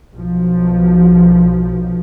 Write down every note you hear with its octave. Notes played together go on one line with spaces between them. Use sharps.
B1 F3